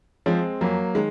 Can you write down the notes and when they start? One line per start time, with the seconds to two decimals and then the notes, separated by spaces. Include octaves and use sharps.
0.26 F3 G#3 C4
0.61 F2 F#3 A#3
0.95 D#3 G#3